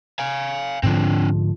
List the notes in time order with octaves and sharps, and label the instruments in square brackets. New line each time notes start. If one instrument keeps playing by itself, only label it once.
[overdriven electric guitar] F5 G#5
[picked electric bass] G#2 D3 F3 [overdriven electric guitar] C4 D4